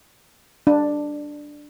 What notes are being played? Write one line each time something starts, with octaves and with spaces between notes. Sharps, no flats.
D4